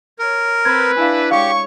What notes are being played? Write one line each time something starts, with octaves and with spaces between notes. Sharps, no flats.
A#4 C#5
C4 B4 G#6
D4 E4 F5 G#5
G#3 G4 C#5 F5 C#6